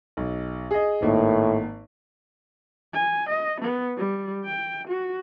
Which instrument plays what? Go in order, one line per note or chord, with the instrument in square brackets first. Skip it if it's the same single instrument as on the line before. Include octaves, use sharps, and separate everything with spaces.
[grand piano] B1
G#4 D#5
[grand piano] G#1 A#3 D#4 [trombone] A2
[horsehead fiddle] G#5
D#5
B3
G3
G5
F#4